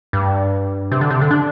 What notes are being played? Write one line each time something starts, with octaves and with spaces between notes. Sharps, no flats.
G2
C3
D3
C3
D3
D4